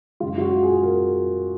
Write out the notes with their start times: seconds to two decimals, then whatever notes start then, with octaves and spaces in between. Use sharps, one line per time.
0.20 F#2 C#3 G#3 F4
0.38 F4
0.41 F#4
0.63 G#4
0.83 A#4